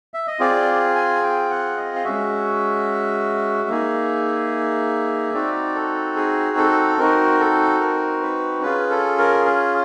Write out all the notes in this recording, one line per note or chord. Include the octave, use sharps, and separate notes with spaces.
E5
D#5
C4 F4 G#4 D5
G#5
G5
F#5
D#5
F5
G#3 C#4 F#4 E5
A#3 D#4 G#4
C4 D#4 F#4 D5
A4
G#4
A4
C4 D#4 F#4 A#4
A4
A#4
B4
C#4 F4 G#4 B4
A4
A#4
G#4